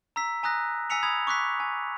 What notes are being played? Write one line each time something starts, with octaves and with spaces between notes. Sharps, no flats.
A#5 E6 B6
G#5 A#5 D#6 F#6 A#6
G#5 E6 B6 C#7 F7
B5 D#6 G#6 F7
C#6 D6 F#6 B6
G#5